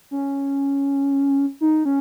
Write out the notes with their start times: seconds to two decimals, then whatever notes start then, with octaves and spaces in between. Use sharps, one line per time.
0.11 C#4
1.61 D#4
1.85 C#4